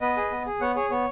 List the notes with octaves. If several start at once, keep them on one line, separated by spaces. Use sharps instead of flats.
B3 B4 D#5
G#4
B3
G#4
B3 C#5 F#5
G#4 C#5
B3 C#5